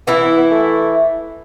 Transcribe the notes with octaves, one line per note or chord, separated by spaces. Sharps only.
E3 B3 E4
B3
B3
A3